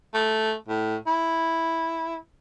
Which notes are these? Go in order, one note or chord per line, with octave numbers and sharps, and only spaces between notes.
A3
A2
E4